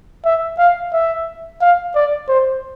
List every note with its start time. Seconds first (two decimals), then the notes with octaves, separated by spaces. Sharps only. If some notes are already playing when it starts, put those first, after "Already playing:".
0.25 E5
0.58 F5
0.93 E5
1.61 F5
1.95 D5
2.28 C5